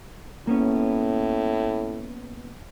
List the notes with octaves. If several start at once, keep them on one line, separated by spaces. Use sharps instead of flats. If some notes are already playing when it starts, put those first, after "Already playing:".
A2 A#3 B3 C#4